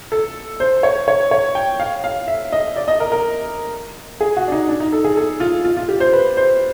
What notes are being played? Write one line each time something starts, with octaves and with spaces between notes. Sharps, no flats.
A4
C5
C#5
C#5
C#5
G5
F5
F5
E5
D#5
D5
D#5
A#4
A#4
G#4
F#4
D4
D#4
D4
D#4
A4
G#4
A4
F4
F4
F4
G4
C5
B4
C5